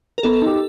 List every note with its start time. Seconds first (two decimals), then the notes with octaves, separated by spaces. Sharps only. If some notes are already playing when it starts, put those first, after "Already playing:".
0.18 A#4
0.23 B3 A4
0.42 D#4 G4